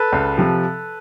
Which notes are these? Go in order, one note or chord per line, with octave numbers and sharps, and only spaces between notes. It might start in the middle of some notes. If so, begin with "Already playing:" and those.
Already playing: A4 B4
C#2
C3 F3